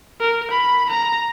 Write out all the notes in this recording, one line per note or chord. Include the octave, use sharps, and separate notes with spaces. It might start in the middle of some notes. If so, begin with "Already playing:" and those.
A#4
B5
A#5